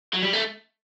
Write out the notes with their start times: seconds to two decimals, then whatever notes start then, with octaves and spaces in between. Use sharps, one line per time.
0.13 F#3
0.22 G3
0.33 A3